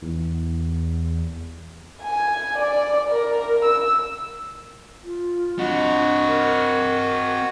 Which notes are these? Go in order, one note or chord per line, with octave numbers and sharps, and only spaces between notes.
E2
G#5
D5
A#4
E6
F4
C4 D4 F#4 D#5
A#4